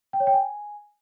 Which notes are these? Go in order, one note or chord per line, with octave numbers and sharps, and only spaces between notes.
G5
C#5
G5
G#5